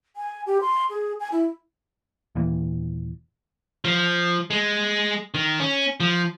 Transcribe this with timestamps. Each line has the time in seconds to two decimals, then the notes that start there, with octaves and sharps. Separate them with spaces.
0.16 G#5
0.46 G4
0.61 C6
0.90 G#4
1.20 G#5
1.32 E4
2.35 D#1 A#2 E3
3.85 F3
4.50 G#3
5.34 D#3
5.60 C#4
6.00 F3